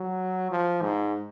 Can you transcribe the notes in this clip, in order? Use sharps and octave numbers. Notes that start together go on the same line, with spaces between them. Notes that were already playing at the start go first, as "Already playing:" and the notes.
Already playing: F#3
F3
G#2